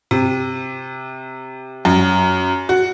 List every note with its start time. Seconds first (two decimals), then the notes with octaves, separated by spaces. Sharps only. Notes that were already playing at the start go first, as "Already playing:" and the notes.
0.11 C3
1.85 F#2
2.69 F#4